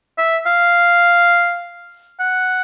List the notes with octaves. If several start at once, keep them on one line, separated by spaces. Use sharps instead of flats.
E5
F5
F#5